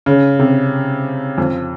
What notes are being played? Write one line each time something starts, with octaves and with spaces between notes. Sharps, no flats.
C#3
C3
F2